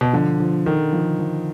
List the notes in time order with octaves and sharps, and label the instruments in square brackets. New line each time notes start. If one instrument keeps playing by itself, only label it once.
[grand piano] B2
[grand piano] D3 [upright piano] F3
[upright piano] F3
[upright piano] D3 [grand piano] D#3
[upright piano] F3
F3